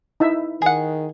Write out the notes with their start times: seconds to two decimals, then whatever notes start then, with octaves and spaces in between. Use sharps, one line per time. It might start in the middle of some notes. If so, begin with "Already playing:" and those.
0.20 D#4 E4 E5
0.62 D#3 G#4 F#5